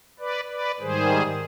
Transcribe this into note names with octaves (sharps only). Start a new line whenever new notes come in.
B4 D5
B4 D5
G#2 D#3 G3 G#4 C5